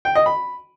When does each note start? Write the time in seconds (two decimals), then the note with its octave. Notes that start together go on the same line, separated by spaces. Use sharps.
0.05 G5
0.15 D#5
0.26 B5